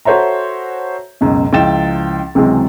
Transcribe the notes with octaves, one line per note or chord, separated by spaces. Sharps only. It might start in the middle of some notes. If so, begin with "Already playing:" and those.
F#4 A4 C5 C#5 E5 A#5
C#2 F#2 B2
C#2 F3 E4 G5 A6 E7
C#2 C3 E3 F#3 G#3 C4